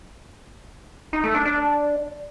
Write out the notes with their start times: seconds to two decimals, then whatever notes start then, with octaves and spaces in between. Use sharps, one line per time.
1.13 D#4
1.24 A3
1.35 D4
1.45 D4